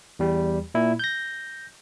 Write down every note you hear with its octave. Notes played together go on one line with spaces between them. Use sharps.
E2 G3
A#2 E4
G6 A#6